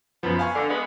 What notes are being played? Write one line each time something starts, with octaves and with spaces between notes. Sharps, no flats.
F#2 F3 B3
F5 G#5 C#6
D3
G#3 B3